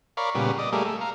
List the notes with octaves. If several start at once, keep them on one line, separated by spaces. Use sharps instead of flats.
A#4 C#5 D5 F5 B5
A#2 C#3 G3 B3
D5 D#5
G3 A3 A#3 G#4
A3
A#4 F5